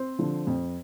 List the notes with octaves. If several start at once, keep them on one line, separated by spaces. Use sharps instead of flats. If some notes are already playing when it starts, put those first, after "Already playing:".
Already playing: C4 C5
D3 F3
F2